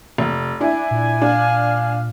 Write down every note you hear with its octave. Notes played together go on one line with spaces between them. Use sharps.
F1
D4 E4 G#5
A#2
D4 F5